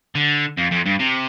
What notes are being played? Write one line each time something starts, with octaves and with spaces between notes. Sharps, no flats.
D3
F2
F2
G2
C3